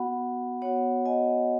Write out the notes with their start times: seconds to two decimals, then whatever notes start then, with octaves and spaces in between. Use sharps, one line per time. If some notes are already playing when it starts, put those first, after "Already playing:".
Already playing: B3 F#4 F#5 B5
0.61 B3 F#4 C#5 F#5
1.06 D#5 G#5